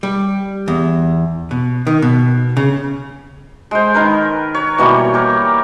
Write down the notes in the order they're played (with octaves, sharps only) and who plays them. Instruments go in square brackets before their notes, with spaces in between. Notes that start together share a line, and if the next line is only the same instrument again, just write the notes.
[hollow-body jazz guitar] G3
E2
B2
D#3
B2
C#3
[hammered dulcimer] G#3 C5
D#3 A#4 B4
C#5
B2 E3 G3 A#3
G4 A#4